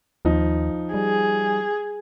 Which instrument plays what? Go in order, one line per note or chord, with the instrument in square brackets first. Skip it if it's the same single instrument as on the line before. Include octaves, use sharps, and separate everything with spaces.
[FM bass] D#2 [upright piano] F3 D#4
[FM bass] G3 [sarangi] G#4